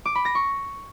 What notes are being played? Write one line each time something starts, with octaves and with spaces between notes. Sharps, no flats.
D6
B5
A#6
C#6